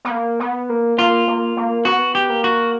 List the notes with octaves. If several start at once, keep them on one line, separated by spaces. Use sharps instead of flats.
B3
A#3
B3
A#3
A#3 F4
A#3
A#3
B3 F#4
G4
A#3
F#4